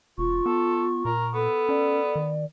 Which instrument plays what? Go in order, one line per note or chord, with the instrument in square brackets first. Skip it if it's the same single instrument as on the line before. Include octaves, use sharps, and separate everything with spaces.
[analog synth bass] E1 [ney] F4 [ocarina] C#6
[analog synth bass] B3 [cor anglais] A4
[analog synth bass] A#2 [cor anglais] A#4
[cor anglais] B3 [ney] A4
[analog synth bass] C#4 [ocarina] D5
[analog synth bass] D#3